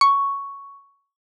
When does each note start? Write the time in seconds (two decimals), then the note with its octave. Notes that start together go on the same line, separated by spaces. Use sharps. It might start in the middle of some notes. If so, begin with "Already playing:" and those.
0.01 C#6